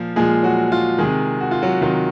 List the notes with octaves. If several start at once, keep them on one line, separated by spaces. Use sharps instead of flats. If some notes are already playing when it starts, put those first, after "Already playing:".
Already playing: A#2 F3 F4
A#2 F3 G#3 G#4
F#3 F#4
F4
C3 D#3 G#3 G#4
F#4
F4
F#3 F#4
C3 D#3 F4